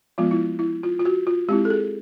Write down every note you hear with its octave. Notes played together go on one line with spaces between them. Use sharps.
F3 G#3 B3 F4
E4
E4
F4
F4
F#4
F4
G#3 C4 E4 G4
A4
G#4